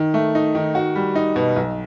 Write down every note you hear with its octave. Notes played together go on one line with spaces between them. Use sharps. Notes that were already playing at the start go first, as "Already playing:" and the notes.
Already playing: D#3
A3
D#4
D#3
F#4
G3
D#4
B2
B1